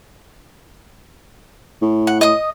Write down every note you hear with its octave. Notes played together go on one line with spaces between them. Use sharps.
A2
F#5
D#5 D#6